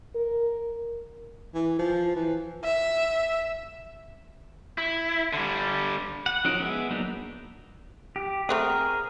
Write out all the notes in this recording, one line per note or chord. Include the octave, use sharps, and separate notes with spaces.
A#4
E3
F3
E3
E5
E4
D3 G3
F#5
F3 C#4 D#4 F#4 A#4
G#3 B3 E5
F#3 A#3 B3 D4 D#4
G4
A3 C4 F#4 G#4 A#4